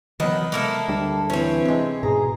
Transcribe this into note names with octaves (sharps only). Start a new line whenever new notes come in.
D#3 E3 F#3 B3 B4 D#5 F#5
G#3 A#3 E4 A4
D2 G3 D4
E3 C4 C#4 C#5
C3 G#3
G#2 B2 G#4 A#5